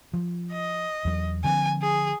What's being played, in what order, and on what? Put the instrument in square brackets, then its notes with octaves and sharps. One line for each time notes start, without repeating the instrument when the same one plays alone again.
[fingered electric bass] F3
[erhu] D#5
[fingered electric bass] E2 F#3
[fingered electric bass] D3 F3 C4 [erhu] G#5
[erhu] G#4